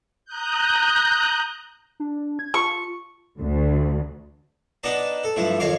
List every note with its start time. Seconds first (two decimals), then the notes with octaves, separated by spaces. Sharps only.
0.25 A#5 D#6 F#6 G6
2.00 D4
2.39 G#6
2.54 F4 C#6
3.40 D2
4.83 B3 D4 D#4 D5 D#5 A5
5.24 A4
5.36 G2 F3 A3 E4
5.60 F2 D#3 C#4 C#5 F5 D6